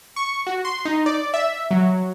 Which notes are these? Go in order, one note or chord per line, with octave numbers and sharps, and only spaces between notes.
C#6
F#4
C6
D#4
D5
E5
F#3